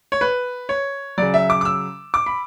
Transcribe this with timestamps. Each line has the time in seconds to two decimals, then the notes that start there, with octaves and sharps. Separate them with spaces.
0.12 C#5
0.21 B4
0.69 C#5
1.18 C#3 F#3 D5
1.34 E5
1.50 D6
1.61 D6
1.65 E6
2.14 D6
2.26 B5